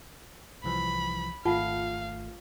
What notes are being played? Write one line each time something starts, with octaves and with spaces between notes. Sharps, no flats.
C2 E3 F3 B5
G#1 A3 F4 F5 F#5 A5